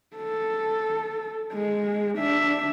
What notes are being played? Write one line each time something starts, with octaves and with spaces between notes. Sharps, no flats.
A4
G#3
D4 E5